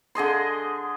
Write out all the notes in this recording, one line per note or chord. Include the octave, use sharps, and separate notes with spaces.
D3 G#4 D#5 C6